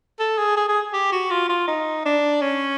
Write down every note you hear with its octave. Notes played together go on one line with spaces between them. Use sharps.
A4
G#4
G#4
G#4
G4
F#4
F4
F4
D#4
D4
C#4